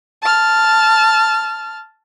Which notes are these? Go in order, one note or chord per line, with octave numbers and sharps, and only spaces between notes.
A5 F6